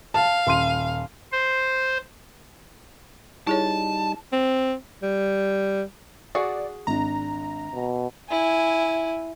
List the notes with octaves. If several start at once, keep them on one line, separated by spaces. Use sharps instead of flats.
F5 A5
D#1 C6 D#7
C5
G3 D#4 E4 G#4 C#5 A5
C4
G3
F#4 G#4 D5 F#5
G#1 D4 A#5
B2
E4 G#5